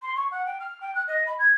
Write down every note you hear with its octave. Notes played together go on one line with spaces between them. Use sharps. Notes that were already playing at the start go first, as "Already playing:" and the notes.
C6
C#6
F#5
G5
F6
G5
F#6
D#5
B5
G#6